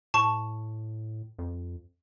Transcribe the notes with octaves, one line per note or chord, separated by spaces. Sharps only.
A2 A5 C#6
F2